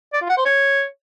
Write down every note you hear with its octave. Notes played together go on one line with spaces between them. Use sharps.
D5
F4
F#5
C5
C#5